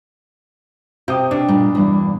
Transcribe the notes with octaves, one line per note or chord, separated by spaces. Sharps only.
C3 G4 D#6
B2 D4
G2 A#2
E2 G2 A#3